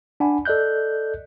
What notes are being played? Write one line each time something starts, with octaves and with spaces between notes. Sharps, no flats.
D4 F#5 G#5 B5
A4 D5 D#5 F#6 G6